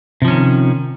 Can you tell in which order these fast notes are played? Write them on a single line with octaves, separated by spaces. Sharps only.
C3 F3 C#4 D#3